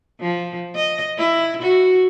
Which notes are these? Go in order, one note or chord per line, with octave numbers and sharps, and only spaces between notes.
F3
D#5
E4
F#4